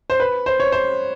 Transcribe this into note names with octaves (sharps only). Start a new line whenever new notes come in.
C5
B4
C5
C#5
C5